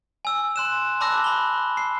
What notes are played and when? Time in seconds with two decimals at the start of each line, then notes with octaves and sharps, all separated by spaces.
0.25 G#5 E6
0.56 C6 F#6 E7
1.00 A5 B5 D6 E6 F#6 A#6
1.24 B5 G7
1.77 C7